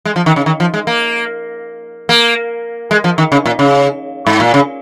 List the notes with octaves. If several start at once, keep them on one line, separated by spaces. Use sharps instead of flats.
G#3
F3
D#3
C#3
D#3
F3
G#3
A#3
A#3
G#3
F3
D#3
C#3
A#2
C#3
G#2
A#2
C#3